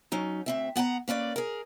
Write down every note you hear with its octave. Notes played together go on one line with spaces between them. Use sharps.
F#3 C#4 D#4
D2 C4 E5
B3 F#5 G5 A#5
A#3 C#4 B4 D5
G#4 A#4